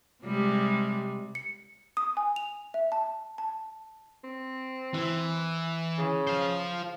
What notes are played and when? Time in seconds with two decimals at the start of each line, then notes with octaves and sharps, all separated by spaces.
0.23 C3 G3 G#3
1.35 C#7
1.97 D#6
2.17 G#5
2.36 F7
2.74 E5
2.92 A5
3.38 A5
4.24 C4
4.94 E3
5.98 C#3
6.27 C5 F5